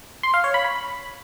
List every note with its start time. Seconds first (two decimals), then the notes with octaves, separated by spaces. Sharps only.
0.23 C6
0.34 F5
0.44 C#5
0.54 B5
0.64 B5